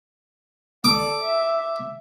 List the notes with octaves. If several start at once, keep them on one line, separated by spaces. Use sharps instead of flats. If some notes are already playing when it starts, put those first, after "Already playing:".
A4 D5 D6
E5